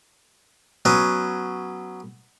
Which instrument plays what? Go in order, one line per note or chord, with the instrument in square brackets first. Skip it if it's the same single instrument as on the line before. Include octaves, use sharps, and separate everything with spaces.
[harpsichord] F#3 B3 C#4